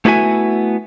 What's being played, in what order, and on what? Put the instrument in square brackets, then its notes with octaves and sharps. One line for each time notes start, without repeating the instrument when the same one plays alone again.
[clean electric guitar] A3 B3 E4 F#4 E5 G#5